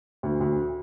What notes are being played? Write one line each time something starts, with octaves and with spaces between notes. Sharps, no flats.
D2
D2